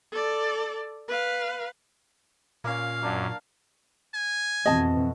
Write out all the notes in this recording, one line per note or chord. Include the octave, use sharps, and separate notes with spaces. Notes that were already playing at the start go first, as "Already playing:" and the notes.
A4 D5
B4 F5
A#2 A#3 C#4 F5
F#2 A#3 D4
G#5
F2 B2 E3 C4 D#5 A5